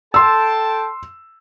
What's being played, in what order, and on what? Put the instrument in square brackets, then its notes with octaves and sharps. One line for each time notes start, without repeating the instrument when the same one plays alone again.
[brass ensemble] A4 G5 A5 [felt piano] C6 E6